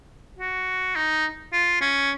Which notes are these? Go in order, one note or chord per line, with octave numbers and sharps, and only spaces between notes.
F#4
D#4
F4
C#4